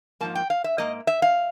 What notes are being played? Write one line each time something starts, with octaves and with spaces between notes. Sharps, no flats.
G#2 F3 A#3 A5
G5
F5
E5
G#2 F3 A#3 D#5
E5
F5